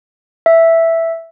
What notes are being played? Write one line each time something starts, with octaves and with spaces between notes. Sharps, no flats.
E5